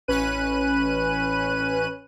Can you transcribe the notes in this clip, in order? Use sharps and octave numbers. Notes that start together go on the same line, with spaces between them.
A1 C#4 B4 F#6 D#7